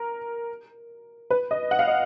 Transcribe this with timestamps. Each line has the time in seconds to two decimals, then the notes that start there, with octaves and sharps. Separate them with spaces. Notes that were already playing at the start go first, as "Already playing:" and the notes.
Already playing: A#4
1.30 B4
1.51 D#5
1.71 F#5
1.79 F5
1.88 D#5